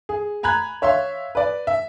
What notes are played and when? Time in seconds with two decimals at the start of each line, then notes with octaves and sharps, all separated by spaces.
0.09 G#4
0.43 G#5 A#5 B5 F#6 G#6
0.82 C#5 E5 F5 C6
1.35 B4 D5
1.67 E5